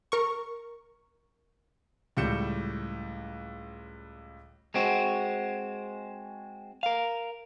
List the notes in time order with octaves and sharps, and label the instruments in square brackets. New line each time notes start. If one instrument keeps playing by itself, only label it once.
[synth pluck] A#4 C#6
[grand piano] C#2 A2 G3 G6 C#7 E7
[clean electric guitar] G#3 C4 F#4
A#4 F5